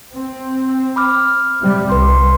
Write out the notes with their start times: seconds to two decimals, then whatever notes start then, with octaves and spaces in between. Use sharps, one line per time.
0.12 C4
0.96 B5 D6 F6
1.61 C3 G3
1.90 C2 B4 C6